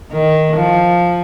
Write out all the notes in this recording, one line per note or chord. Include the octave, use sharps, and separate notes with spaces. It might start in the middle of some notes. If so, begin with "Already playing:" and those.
D#3
F3